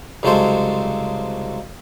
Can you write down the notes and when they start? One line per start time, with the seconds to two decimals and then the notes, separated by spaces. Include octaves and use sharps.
0.23 C2 C#3 F#3 G#3 A4 C5